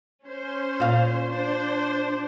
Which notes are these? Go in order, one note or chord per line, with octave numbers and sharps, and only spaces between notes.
C#4 C5
A#2 F5
D4 C5